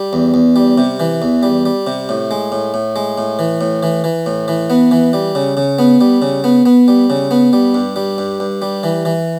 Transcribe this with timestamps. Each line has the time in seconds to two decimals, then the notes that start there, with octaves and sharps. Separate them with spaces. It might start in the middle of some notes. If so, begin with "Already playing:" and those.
Already playing: G3
0.13 E2
0.34 E2
0.56 G3
0.78 C3
1.00 E3
1.22 E2
1.43 G3
1.65 G3
1.87 C3
2.09 A2
2.31 G#3
2.52 A2
2.74 A2
2.96 G#3
3.18 A2
3.39 E3
3.61 A2
3.83 E3
4.04 E3
4.26 A2
4.48 E3
4.70 B3
4.91 E3
5.13 G3
5.35 C#3
5.57 C#3
5.79 B3
6.01 G3
6.22 C#3
6.44 B3
6.66 B3
6.88 G3
7.10 C#3
7.31 B3
7.53 G3
7.75 G2
7.96 G3
8.18 G2
8.40 G2
8.62 G3
8.83 E3
9.05 E3